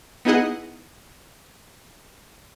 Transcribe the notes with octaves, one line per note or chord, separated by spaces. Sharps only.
B3 D#4 E4 G#4 D#5 F#5